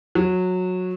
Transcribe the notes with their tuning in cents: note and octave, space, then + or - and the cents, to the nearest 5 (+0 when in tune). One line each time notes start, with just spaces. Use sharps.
F#3 -15